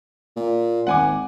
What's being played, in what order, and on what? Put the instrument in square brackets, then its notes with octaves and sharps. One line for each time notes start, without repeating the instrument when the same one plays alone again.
[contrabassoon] A#2
[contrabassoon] G#1 [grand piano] F#5 G#5 D6